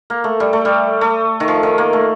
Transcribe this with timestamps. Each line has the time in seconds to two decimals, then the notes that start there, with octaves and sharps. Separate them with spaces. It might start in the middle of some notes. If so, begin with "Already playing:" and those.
0.10 A#3
0.24 A3
0.40 G3
0.53 A3
0.65 G3
1.01 A3
1.40 D#3
1.48 F3
1.63 D#3
1.78 A#3
1.93 A3